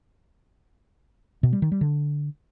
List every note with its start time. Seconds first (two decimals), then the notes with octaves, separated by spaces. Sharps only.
1.43 B2
1.53 G3
1.62 D#3
1.72 G3
1.81 D3